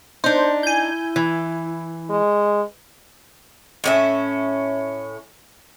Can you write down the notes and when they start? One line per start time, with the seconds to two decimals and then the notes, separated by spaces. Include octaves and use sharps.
0.24 D4 D#4 C5
0.63 E4 G#5 G6
1.16 E3
2.10 G#3
3.84 A2 C#4 E5